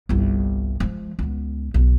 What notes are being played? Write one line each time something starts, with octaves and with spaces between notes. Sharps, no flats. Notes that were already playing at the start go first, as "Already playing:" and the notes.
G1 C2
F3 G#3
C#2 B3
B1 C#3